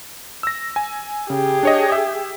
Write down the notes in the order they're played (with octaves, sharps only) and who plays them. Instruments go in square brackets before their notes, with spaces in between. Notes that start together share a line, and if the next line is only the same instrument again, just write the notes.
[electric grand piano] E6 A#6
G#5
[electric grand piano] C#3 [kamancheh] G4 G#4
[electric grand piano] D4 C#5 D#5
E5